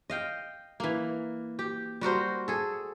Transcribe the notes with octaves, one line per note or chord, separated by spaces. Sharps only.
D#5 F5 G5
E3 A#3
G4
G3 F#4 A#4 C5
G#4 A4